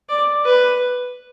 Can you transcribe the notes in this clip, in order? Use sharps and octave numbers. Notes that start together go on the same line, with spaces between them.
D5
B4